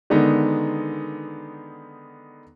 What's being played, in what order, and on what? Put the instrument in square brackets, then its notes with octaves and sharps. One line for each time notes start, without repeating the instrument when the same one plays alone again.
[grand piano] D3 D#3 G#3 B3 D#4